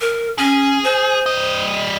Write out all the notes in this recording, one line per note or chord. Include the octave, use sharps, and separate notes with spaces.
A#4
C#4 G#4
C5
G3 D#5